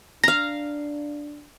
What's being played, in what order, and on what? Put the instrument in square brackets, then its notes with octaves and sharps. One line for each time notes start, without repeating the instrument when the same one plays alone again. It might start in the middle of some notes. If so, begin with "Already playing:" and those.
[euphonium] D4 [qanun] F5 A#5 [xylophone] A#6